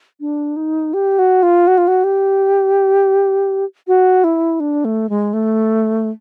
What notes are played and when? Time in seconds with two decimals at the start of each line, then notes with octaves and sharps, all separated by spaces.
0.20 D4
0.56 D#4
0.93 G4
1.19 F#4
1.43 F4
1.67 F#4
1.78 F4
1.88 F#4
2.04 G4
3.87 F#4
4.24 E4
4.60 D4
4.85 A3
5.09 G#3
5.33 A3